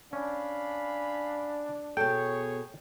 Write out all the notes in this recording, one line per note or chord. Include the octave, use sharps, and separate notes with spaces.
C#4 D4 F5 G#5 B5
B2 G#4 A4 C#5 G5